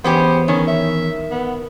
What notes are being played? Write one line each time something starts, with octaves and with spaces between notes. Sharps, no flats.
E2 B3 C#4 G4 C5
D#3 C#4
E5
B3